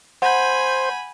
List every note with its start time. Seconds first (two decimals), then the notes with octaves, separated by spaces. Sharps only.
0.22 C5 F#5 G#5 B5 G6